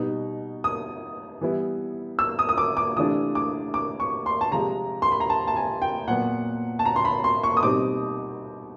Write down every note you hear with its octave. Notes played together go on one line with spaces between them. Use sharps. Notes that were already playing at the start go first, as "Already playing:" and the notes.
Already playing: B2 G3 B3 D#4
D#6
E3 G3 B3 E4
E6
D#6
D#6
D6
D6
C3 E3 A3 D4 F4 D#6
D6
D6
C#6
C6
A5
C3 F3 G#3 A#5
C6
B5
A#5
A5
A5
G#5
G5
A#2 F#3 B3 F#5
A5
A#5
C6
B5
C6
C#6
D#6
B2 G3 C4 D#4 D6